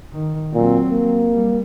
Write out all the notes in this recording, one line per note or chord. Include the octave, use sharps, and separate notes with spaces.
D#3
A#2 F#3 C4
A#3
G3